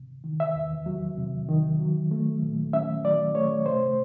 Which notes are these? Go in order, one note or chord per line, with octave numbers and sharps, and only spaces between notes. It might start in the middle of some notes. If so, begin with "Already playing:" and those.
Already playing: C3
D#3
E5
E2
F#3
C3
D#3
F#3
A3
A#2
C#4 E5
F#3 D5
A3 C#5
C3 C5